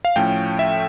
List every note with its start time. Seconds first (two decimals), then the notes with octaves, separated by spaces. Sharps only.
0.05 F5
0.16 A2 F3 A3 C#4 G5
0.59 E5